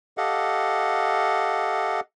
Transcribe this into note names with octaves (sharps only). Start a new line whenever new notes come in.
G4 A4 D#5 F5 F#5